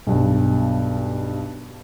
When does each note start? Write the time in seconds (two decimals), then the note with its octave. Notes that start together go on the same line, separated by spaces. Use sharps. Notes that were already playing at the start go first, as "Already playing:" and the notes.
0.07 B1 G2